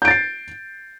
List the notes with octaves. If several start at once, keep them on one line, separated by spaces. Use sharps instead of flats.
G6 A6 C7 D7